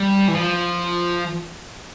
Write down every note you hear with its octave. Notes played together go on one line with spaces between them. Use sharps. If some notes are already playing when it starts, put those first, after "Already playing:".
Already playing: G3
E3
F3